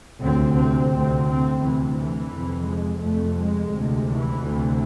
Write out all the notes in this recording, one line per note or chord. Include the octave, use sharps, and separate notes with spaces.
D2 C3 C4
C4
D2 C3
C4
D2 C3 E3
E3
F2 C3
G#3
F2 C3 A3
G#3
D2 C3
E3
D2 C3